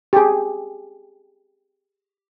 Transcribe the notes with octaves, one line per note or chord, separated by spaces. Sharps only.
G4 G#4